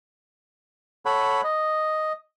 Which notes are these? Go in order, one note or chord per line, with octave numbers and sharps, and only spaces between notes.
A4 C#5 F#5 B5
D#5